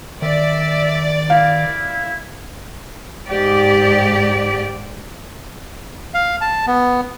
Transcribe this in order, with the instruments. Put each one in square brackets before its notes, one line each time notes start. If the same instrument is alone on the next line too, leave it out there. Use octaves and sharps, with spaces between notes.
[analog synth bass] D#3 [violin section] D5 [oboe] E5
[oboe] E4 [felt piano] F5
[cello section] G#2 G4 D5
[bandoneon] F5
A5
B3